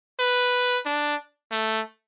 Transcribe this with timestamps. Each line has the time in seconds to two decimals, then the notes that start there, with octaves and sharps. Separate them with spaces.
0.19 B4
0.86 D4
1.51 A3